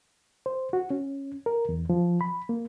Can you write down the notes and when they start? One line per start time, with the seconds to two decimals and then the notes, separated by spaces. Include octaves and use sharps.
0.46 C5
0.73 F#4
0.90 C#4
1.46 A#4
1.69 E2
1.90 F3
2.21 B5
2.49 A#3